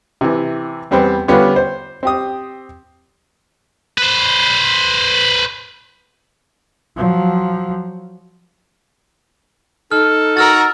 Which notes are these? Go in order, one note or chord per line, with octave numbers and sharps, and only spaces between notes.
C3 E3
E2 G3 B3 C4
D3 G3 B3 C#4 F4
C5
C4 G4 D#6
B4 C5
F3 F#3
D#4 A4 F6
F#4 A#4 E6 F6 A6